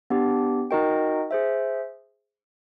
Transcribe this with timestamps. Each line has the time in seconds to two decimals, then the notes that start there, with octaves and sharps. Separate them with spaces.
0.10 B3 D4 G4
0.71 D#4 F#4 A#4 D#5 G5
1.31 G#4 C5 E5